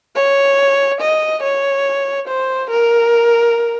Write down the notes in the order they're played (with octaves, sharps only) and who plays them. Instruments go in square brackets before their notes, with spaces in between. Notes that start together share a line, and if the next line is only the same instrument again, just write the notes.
[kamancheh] C#5
D#5
C#5
C5
A#4